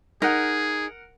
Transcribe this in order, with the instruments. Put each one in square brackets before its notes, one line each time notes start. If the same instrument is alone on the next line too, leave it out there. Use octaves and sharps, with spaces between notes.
[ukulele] D#4 [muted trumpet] G#4 [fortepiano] A#4 F#5